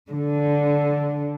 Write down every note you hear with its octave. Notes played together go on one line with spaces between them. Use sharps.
D3